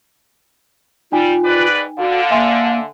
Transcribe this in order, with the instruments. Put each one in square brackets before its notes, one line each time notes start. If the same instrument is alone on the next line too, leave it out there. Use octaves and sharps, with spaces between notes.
[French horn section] G3 [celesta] D#4 G5 G#5 [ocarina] F4
[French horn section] G#2 B4 D5
[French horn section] D3 [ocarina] F#4 [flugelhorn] F5
[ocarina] A#3 [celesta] E5 G#5 C6